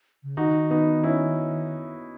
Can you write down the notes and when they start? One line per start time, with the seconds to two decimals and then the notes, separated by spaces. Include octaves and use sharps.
0.23 C#3
0.37 D#3 D#4 F#4
0.70 B3 D#4
1.04 C#4 E4